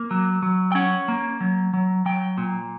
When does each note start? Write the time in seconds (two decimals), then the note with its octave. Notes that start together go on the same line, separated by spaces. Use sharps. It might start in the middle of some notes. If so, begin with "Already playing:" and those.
Already playing: A#3
0.11 F#3
0.42 F#3
0.72 G5
0.75 C#4 F#5
1.08 A#3
1.41 F#3
1.74 F#3
2.05 F#3 G5
2.38 A#2